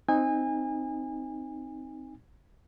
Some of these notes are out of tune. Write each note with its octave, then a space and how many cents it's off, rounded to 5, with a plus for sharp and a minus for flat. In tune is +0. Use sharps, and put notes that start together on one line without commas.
C4 +0 D#4 +0 G#5 -30